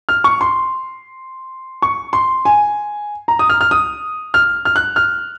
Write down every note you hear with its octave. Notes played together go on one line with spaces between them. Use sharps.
F6
C#6
C6
C#6
C6
G#5
A#5
D#6
F6
F6
D#6
F6
F6
F#6
F6